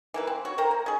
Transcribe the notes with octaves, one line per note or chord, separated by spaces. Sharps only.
E3 A#3 B4
C4
F#4 C#5
A#4 C5 G5 A#5
A#3
C#4 G#4